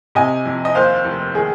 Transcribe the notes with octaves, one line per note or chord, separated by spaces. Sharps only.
C3 D#5 G#5
F2
D#5
D#2 C5 F5
F1
D#3 G#4